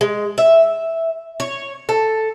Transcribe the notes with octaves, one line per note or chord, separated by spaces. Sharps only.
G#3
E5
C#5
A4